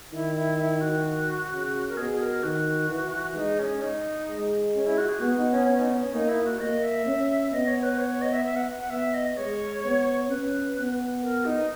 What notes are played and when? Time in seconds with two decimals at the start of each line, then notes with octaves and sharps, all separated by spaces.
0.12 D#3 E4
0.35 E4
0.58 E4
0.81 F#4
1.51 C#3
1.89 A#4
1.96 B2 G#4
2.20 A#4
2.43 D#3 F#4
2.89 E3
3.35 G#3 D#4
3.59 C#4
3.82 D#4
4.28 G#3
4.75 C#4
4.86 E4
4.98 F#4
5.09 G#4
5.21 B3 F#4
5.37 D#4
5.52 C#4
5.66 C#4
5.79 D#4
5.90 C#4
6.02 C#4
6.13 A#3 D#4
6.29 E4
6.44 F#4
6.59 A#3 D#5
6.83 E5
7.06 C#4
7.51 B3 D#5
7.67 C#5
7.83 B4
7.98 C#5
8.10 C#5
8.22 D#5
8.33 E5
8.45 E5
8.56 F#5
8.79 F#5
8.90 B3 E5
9.14 D#5
9.37 G#3 C#5
9.84 B3
10.29 C#4 B4
10.76 B3
11.22 A#4
11.45 D#4